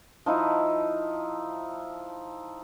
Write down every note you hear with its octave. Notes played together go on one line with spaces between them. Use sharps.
F3 D#4 E4